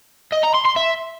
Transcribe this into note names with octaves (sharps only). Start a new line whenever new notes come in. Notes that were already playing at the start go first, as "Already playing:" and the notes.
D#5
A#5
C6
C6
E5